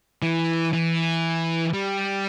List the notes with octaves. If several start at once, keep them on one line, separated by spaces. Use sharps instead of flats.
E3
E3
G3